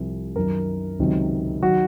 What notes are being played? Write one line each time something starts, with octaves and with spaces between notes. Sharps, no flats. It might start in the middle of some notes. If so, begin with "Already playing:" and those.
Already playing: C2 C3 F3
F#2 D#3 F#3 A#4
C#2 C3 D#3 F#3
D#3 F#3 F#4